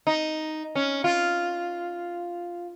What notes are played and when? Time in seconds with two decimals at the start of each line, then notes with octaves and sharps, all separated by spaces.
0.07 D#4
0.75 C#4
1.04 F4